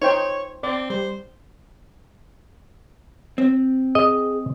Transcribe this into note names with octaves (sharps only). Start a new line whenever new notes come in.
D#4 C5 C#5 G5
C4 D5
G3 C5
C4
G#4 D#5